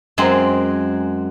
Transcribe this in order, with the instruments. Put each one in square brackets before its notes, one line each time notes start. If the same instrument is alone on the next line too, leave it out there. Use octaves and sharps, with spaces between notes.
[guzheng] F#2 G#3 C4